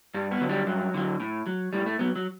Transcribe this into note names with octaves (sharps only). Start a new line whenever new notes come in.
G2 G3
B3
D3 F#3
G3
G2 F#3
D3 F#3
A2
F#3
A2 G3
A3
F#3 B3
F#3